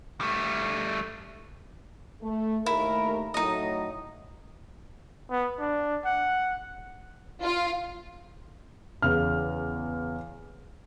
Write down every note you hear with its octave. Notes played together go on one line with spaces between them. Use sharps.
G3 A3
A3
D#2 A3 E4 A#4
A2 F#3 D#4 D#5
B3
D4
F#5
F4
E2 C#3 F6